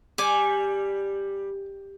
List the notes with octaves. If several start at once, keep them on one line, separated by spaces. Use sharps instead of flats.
G3 G#5 D6